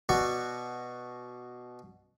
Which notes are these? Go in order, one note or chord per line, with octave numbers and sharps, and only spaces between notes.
B2 F#4 D5 C#6